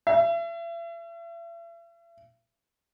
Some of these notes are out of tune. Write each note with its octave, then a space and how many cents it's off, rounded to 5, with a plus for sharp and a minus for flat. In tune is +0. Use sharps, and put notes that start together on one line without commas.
E5 +40